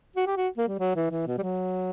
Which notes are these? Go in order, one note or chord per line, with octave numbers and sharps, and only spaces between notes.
F#4
G4
F#4
A#3
G3
F#3
E3
E3
B2
G3
F#3